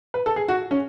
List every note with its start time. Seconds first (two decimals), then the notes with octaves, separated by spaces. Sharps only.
0.14 B4
0.26 A4
0.36 G#4
0.48 F#4
0.71 C#4